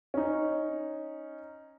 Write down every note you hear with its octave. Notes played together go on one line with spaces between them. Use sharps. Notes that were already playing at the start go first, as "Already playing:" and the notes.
C#4 D#4